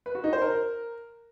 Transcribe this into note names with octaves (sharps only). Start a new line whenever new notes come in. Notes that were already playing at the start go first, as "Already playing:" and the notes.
B4
F#4
D#4
C5
A#4